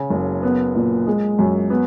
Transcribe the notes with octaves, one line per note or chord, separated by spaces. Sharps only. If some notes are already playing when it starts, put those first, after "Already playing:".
Already playing: C#3
F#1
B3
A#2
G#3
F#2
B3